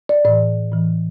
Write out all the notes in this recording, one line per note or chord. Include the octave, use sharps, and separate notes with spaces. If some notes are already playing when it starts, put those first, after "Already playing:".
D5
A2 E3 D5
A2 E3